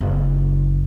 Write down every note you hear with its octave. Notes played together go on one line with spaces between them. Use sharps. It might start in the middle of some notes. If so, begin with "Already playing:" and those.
F#1